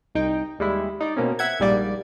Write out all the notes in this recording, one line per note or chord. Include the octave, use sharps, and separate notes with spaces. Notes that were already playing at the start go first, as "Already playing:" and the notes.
C2 D#4 G5
D#2 G3 G#3 E4
D#4 D5
B2 A#3 C4 C#4
E5 F#5 G#6
A#1 G#2 G3 A#3 D5